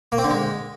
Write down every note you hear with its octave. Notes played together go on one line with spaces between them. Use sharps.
A#3
C4
D3
G#3